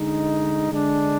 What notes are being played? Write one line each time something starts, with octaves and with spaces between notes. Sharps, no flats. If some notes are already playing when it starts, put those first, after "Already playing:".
Already playing: D3 G#3 D#4
D3 G#3 D4